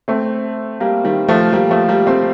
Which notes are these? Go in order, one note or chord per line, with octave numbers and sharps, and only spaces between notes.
A3 C4
G3 A#3
D#3 G3
F3 A3
G3 A#3
F3 A3
G3 A#3
A3 C4